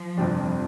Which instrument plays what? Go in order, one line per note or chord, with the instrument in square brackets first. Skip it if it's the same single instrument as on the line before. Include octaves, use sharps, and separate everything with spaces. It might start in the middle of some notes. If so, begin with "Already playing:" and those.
Already playing: [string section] F3
[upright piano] G1 F2 C3 G3 D4